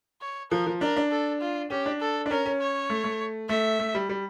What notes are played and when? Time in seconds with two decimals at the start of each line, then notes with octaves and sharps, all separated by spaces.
0.21 C#5
0.51 F3 A#4
0.67 F3
0.81 D4 A#4
0.96 D4
1.11 A4
1.41 F4
1.70 C#4 G4
1.86 D4
2.00 A4
2.26 D4
2.30 C#4 A#4
2.46 C#4
2.60 C#5
2.90 A3
3.04 A3
3.49 A3 E5
3.79 A3
3.95 G3
4.09 G3